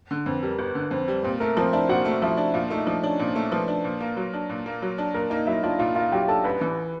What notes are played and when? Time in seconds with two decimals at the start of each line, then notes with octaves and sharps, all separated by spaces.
0.11 D3
0.26 F2 B4
0.43 G3 A#4
0.59 G1 B4
0.75 D3
0.91 F2 C4 C5
1.08 G3
1.23 A#2 C4 C5
1.40 A3 A#4
1.57 F3 C4 C5
1.73 D4 E4 E5
1.89 A#2 F#4 F#5
2.05 A3
2.22 F3 E4 E5
2.37 D4
2.54 A#2 F4 F5
2.70 A3 D#4 D#5
2.87 F3 D4 D5
3.02 C#4 D4 C#5
3.19 A#2 C4 C5
3.35 A3
3.51 F3 B4
3.68 D4
3.84 A#2
4.01 A#3
4.17 F#3
4.33 D4
4.50 A#2
4.66 A#3
4.82 F#3
4.98 D4
5.14 A#2 A#4
5.30 A#3 D#4 D#5
5.47 F#3 E4 E5
5.63 D4 F4 F5
5.79 A#2 F4 F5
5.95 A#3 F4 F5
6.12 F#3 G4 G5
6.28 D4 A4 A5
6.44 A1 B4 B5
6.61 E3